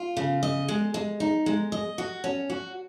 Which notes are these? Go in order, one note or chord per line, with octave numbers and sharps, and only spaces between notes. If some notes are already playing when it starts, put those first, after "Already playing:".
Already playing: F4
C#3
D#5
G#3
G#3
D#4
G#3
D#5
F#4
C#4
F#4